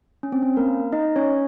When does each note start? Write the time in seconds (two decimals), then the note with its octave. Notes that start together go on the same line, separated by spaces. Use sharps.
0.23 C#4
0.32 C4
0.43 C#4
0.57 A#3 A#4
0.92 D#4 D#5
1.16 C#4 C#5